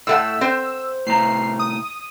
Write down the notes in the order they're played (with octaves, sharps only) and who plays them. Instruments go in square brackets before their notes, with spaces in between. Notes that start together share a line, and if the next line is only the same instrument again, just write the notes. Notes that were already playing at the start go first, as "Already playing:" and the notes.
[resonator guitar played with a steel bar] A2 A3 F#5 [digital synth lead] E6
[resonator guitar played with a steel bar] C4 C5
[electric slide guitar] A2 C3 A#5 [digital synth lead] C7
[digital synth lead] D#6